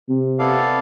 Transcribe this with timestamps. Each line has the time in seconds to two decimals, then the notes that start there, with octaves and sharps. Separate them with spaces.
0.09 C3
0.39 B3 E4 A4 D5 F5